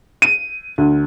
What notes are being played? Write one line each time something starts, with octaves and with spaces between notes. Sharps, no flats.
D#7
D2